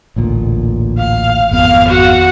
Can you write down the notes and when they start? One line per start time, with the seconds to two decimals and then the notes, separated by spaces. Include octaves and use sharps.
0.16 A1 D2 A#2
0.98 F5
1.51 G#1 F2 B3 F5
1.88 F#4 F#5